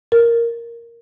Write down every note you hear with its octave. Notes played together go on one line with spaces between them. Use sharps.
A#4